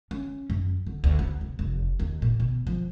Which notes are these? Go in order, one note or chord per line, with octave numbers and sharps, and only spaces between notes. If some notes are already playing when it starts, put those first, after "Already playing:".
C#4
F#2
D3
D2
B3
F1
F1
D#2
A#2
B2
F3